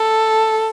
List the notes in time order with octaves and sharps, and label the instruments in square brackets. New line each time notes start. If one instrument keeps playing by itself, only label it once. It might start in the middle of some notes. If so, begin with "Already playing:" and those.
Already playing: [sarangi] A4